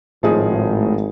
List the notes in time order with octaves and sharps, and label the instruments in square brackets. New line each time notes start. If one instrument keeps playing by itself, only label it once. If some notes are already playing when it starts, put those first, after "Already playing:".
[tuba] G#1 [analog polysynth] A2 [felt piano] F3 D#4 G#4